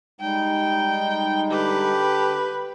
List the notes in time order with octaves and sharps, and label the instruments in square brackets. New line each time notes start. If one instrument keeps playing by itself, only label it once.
[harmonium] G3 G#3 D#4 [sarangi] G5
[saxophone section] D3 G4 [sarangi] B4